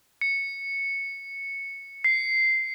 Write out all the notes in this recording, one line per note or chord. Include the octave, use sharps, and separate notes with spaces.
C#7
C7